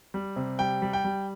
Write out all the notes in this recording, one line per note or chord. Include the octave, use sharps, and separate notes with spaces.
G3
C3
G3 G5
G3
G5
G3